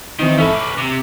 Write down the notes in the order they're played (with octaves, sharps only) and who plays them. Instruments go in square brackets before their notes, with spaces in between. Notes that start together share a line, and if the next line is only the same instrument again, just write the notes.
[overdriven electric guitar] D#3 [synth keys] E3 C4 D#4
[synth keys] G#1 A4 E5 [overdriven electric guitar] C#4 B4
[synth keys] D6
[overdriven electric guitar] C3